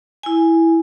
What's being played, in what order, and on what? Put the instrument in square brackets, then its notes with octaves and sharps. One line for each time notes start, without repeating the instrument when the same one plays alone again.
[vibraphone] E4 G#5